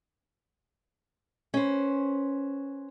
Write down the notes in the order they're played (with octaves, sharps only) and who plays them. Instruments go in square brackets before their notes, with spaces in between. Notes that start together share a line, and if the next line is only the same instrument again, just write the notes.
[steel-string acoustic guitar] C#4 B4 C5